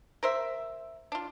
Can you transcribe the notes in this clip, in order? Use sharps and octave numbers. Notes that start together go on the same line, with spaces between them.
A#4 C5 E5
D4 F4